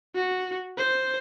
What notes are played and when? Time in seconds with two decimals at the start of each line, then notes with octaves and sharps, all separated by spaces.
0.15 F#4
0.78 C5